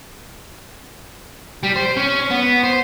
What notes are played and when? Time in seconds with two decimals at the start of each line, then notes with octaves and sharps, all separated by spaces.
1.63 G3
1.76 C5
1.97 C#4
2.31 B3
2.63 C5